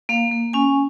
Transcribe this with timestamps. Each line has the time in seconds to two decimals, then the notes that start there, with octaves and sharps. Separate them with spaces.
0.09 A#3 F5
0.31 A#3
0.53 C#4 G#5